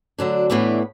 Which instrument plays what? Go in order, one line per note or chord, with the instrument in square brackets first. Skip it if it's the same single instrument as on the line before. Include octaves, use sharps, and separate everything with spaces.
[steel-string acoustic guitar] D2 D3 F#3 D4
A2 E3 B3 D4